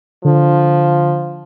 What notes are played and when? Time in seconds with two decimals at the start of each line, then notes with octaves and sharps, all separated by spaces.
0.25 D3 F3